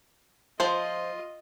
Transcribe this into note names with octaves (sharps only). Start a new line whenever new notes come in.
F3 F4 C5 D#5